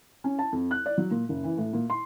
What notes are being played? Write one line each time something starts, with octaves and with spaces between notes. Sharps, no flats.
C#4
A5
F2
F#6
D5
F#3
A#2
F#1
E3
A2
A#2
C6